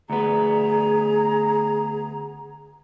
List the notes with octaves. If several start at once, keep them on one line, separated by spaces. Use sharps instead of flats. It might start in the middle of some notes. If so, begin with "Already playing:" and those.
D2 B3 G#4 A#5